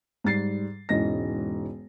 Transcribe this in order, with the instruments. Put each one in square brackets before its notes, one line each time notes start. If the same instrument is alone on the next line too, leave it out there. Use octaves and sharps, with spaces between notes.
[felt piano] G#2 G3 A6 C7
E1 G#2 E3 C#4 D#5 A#6